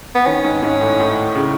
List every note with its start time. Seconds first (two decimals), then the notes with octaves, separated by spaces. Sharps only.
0.15 B3
0.26 D#3 C#4
0.44 G#2
0.62 G#2
0.81 A2
1.00 A2
1.35 C#3